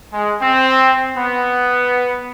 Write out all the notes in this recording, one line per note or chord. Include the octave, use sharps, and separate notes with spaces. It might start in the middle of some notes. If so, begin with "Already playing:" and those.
G#3
C4
B3